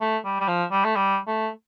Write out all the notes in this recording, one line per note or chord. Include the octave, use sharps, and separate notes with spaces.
A3
G3
G3
F3
G3
A3
G3
A3